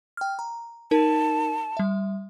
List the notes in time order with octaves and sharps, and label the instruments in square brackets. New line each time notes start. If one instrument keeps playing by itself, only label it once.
[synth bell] G5 F6
A#5
[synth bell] D#4 A#4 [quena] A5
[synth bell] G3 E5